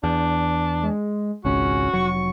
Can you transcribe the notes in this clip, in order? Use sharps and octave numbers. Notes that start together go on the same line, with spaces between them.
E2 D4
G#3
G#1 C#2 C#4 F#4
F1 F#3 C#6